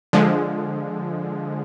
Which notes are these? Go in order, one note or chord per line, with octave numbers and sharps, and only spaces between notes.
D3 F3 G#3